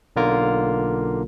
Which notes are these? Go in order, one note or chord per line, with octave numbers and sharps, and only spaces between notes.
B1 D3 A#3 F4 A#4